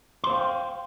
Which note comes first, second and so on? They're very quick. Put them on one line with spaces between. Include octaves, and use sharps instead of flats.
C6 C5 F5 G5